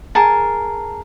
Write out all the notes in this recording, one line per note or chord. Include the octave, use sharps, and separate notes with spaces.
G#4 A#4 A5